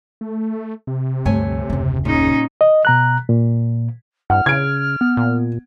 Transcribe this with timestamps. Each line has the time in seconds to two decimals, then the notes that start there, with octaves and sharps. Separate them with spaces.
0.21 A3
0.87 C3
1.25 D2 G2 A3 C#5 G#5
1.70 F#1 D#2
2.05 A#2 C#3 C#4 D#4
2.61 D#5
2.85 B2 A#5 F#6
3.29 A#2
4.30 G2 F#5 F6
4.46 C#3 G#6 D7
5.01 B3
5.17 A#2